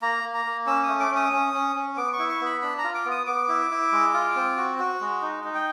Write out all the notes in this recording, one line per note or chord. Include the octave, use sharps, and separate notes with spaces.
A#3 A#5
A#3
A#5
A#3
C#4 E6
D#6
A3
D6
C#4
D#6
C#4
C#4
C#4
B3 D6
C#6
E4
C#6
B3
B5
D4 B5
A#5
F4
D6
B3
D#6
B3 D6
E4
E4
G#3
F4
C4
F#4
F#4
G#3
D#4
D#4
G5